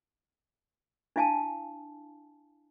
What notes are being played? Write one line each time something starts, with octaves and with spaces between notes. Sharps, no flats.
D4 E4 F5 G#5 A5